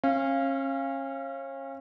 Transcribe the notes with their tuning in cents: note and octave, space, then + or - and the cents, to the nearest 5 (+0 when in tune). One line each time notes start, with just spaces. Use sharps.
C#4 -35 F5 -15